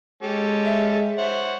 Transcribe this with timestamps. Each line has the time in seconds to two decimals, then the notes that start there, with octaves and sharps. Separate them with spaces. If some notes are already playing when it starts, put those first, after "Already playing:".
0.23 G#3 C#4 G4 A4
0.65 E5
1.18 C5 C#5 F#5